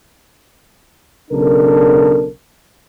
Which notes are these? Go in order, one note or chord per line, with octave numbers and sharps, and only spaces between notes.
B1 C#3 D4 A4 A#4